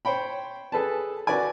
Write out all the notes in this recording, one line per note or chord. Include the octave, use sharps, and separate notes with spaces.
C5 C#5 G5 B5
G#4 A4 B4 A5
F#4 A#4 B4 D5 G#5